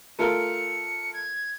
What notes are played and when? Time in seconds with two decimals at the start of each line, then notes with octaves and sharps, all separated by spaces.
0.19 A3 F4 A#4 C#7
1.13 G#6